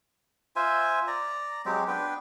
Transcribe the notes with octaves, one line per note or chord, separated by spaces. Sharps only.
F4 C5 E5 G#5
D5 A#5
F#3 G#3 C4 G4
B3 D4 B4 G5